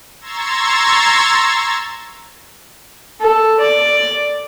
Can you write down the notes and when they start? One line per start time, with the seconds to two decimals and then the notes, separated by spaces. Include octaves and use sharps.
0.20 A#5 C6 C#6 E6 G#6 A6
3.20 A4
3.60 D5